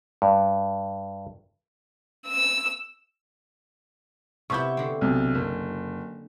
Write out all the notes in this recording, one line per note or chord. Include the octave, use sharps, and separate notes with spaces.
G2
E6
C3 B3 E4 C#6 G6
D3 C4
B1 C3
F#1